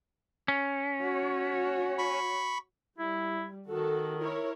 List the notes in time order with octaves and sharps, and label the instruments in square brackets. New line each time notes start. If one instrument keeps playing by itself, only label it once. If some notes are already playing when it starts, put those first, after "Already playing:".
[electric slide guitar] C#4
[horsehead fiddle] F#4 C#5
[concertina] B5 C#6
[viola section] G3 [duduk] E4
[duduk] D#3 [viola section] F#4 A4
[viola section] E4 A#4 C#5